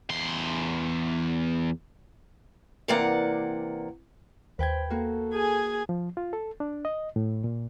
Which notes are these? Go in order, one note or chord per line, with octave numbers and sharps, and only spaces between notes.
E2 C6
C3 E3 A#3 D5 F#5
D#2 B4 C5 G5 G#6
A#3 F#4 A4
G#4 G#5
F3
F4
A4
D4
D#5
A2
A#2